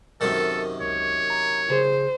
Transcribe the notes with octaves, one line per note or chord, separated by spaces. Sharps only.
F#2 C3 D#3 A4
C#2 C#5
A#5
C#3 G#4 C5